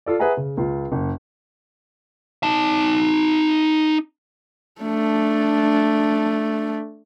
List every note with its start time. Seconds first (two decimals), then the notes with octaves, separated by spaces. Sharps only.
0.06 F4 A4 D5
0.19 G#4 B4 E5 F#5 G#5 A#5
0.37 C#3
0.57 C#2 F4
0.92 F#1
2.43 D#4 A5
4.81 A3 D4